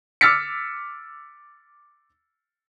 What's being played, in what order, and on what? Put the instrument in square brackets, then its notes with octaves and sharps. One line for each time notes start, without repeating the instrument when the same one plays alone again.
[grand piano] D6 E6 F6 A6 B6 C#7